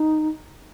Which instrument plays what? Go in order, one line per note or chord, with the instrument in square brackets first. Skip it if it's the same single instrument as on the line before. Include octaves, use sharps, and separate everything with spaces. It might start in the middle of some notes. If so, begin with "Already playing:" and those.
Already playing: [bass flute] D#4